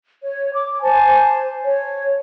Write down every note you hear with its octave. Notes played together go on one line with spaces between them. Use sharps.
C#5
D6
C5 G#5 A5
C#5